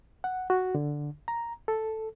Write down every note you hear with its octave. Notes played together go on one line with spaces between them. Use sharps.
F#5
F#4
D3
A#5
A4